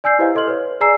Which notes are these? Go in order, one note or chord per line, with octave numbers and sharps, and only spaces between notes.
D5 G#5 E6 G6 C7
E4 G4 B4 C5 D#5 F5
A4 D#5 C6 F6 F#7
B4 C#5
G#4 D5 G#5 A#5 E6 C7